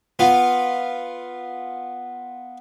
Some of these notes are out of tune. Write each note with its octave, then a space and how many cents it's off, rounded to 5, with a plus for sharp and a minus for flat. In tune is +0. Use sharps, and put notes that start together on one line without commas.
B3 +0 F4 +0